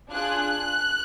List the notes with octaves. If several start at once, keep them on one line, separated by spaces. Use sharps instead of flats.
D4 F4 G#4 F#6